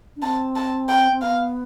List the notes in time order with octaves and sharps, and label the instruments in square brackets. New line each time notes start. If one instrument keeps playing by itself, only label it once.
[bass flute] D4
[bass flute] C4 [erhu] A5
[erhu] A5
G5
[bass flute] C4
[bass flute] B3 [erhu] F5